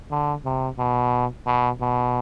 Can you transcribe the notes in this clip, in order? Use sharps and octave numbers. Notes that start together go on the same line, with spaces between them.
D3
C3
B2
B2
B2